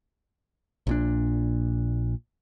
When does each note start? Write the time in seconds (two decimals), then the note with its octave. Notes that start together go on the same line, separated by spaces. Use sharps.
0.87 A#1 A#2 D4